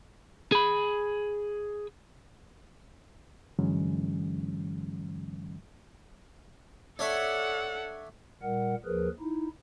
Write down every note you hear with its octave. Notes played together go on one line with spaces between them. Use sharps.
G#4 B5
G2 D3 E3 F#3 G#3 C#4
D4 A4 C#5 E5 F#5
A#2 G3 A#4 F#5
D#2 F3 G#4 A#4 B4
D#4 E4